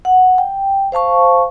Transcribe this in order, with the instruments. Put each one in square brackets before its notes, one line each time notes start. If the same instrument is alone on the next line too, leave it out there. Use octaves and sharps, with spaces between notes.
[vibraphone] F#5
G5
C5 F5 A5 C#6